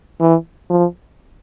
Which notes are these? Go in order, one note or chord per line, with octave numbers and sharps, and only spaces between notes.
E3
F3